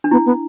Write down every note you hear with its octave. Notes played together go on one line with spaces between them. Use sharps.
D4
B3 E4
B3